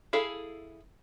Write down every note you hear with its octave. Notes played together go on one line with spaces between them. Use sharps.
E4 G#4 A4 F5